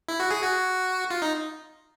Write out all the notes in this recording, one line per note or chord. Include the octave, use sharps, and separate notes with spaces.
E4
F#4
G#4
F#4
F4
D#4